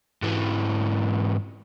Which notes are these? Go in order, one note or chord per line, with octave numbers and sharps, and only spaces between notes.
G#2 E3